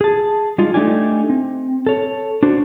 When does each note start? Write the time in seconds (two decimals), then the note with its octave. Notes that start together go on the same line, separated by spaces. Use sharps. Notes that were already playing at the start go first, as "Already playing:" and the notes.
0.01 G#4 A5
0.58 G3 G#3 D#4 F4
0.74 A3 D4 D#4 G4 D5 G#5
1.30 C4
1.86 A4 C#5
2.43 D4 F#4 C5